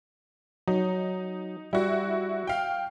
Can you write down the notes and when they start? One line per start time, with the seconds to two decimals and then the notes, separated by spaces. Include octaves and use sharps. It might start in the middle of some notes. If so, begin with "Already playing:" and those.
0.68 F#3 D#4
1.73 G3 E4 F#4
2.47 F5 G5